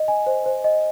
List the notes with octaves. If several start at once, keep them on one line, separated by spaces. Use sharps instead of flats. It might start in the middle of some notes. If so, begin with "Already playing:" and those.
Already playing: D#5
G#5
C5
C5
D#5